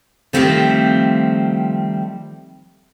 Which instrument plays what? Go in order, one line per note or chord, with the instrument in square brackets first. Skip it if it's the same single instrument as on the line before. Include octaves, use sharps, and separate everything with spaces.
[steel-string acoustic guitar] D#3 F3 G3 A3 C4 F4